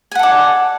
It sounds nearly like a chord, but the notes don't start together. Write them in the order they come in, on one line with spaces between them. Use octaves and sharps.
G#5 F#5 A4 D5